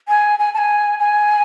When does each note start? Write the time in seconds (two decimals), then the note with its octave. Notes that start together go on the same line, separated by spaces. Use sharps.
0.08 G#5
0.39 G#5
0.54 A5
0.58 G#5
0.99 G#5